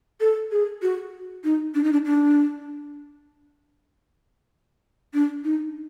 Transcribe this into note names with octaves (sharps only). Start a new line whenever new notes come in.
A4
G#4
F#4
D#4
D4
D#4
D4
D4
D4
D#4